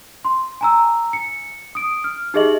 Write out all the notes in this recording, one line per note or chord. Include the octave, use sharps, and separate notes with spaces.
C6
G#5 A#5 E6
C#7
D#6 D7
F6
D#4 G4 G#4 D#5 E5 F#7